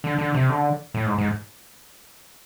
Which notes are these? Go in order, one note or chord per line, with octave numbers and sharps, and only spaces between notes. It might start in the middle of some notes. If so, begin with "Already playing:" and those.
D3
D3
C3
D3
A2
G#2
G#2